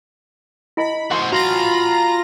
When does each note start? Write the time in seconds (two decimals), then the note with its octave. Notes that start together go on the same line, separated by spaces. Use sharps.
0.77 E4 D#5 G#5 B5
1.11 F#4 C5 F#5 C6
1.32 F4 F#4 A#5 B5 A#6